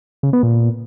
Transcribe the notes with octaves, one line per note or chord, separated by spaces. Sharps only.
C#3
B3
A#2